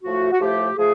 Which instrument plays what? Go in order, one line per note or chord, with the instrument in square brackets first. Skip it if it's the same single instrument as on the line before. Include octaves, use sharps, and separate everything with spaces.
[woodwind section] A2 F3 A3 F#4
F#4
A2 F3 A3 G4
F3 A3 G#4